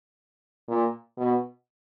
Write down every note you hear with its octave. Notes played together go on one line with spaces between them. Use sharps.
A#2
B2